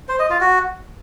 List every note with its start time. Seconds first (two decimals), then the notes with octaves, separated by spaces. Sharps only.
0.08 C5
0.19 D#5
0.30 F4
0.41 F#4